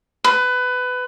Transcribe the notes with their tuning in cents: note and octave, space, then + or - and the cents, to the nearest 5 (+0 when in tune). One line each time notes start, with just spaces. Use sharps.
B4 +20